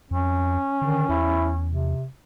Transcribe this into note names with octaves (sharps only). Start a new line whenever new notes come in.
F2 C#4
D3 D#3
E2 E4
C3